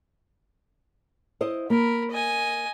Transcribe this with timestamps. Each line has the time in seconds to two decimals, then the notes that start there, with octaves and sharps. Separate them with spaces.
1.41 E4 C5 D#5
1.70 A#3 A#4 B5
2.11 D#5 G#5